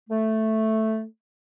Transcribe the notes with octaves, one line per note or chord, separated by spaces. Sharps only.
A3